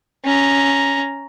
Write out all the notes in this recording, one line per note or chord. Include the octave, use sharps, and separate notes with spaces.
C#4 A#5